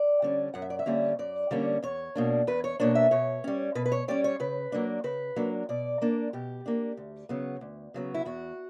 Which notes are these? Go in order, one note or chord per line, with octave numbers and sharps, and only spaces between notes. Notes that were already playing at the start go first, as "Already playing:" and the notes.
Already playing: D5
D3 G3 C#4
F#2 F#5
E5
D5
E5
D3 G3 A#3 C#4
F#2 D5
D3 G3 A#3 C#4
E2 C#5
B2 A#3 D4
E2 B4
C#5
B2 A#3 D4 C#5
E5
B2 C#5
G3 C#4
B2 B4
B4
C#5
G3 C#4 D5
C#5
C#3 B4
F#3 A#3 D4
C#3 B4
F#3 A#3 D4
B2 D5
A#3 D4
B2 G4
A#3 D4
D2
C#3 F#3 B3
D2
C#3 F#3 B3
E4
E2 F#4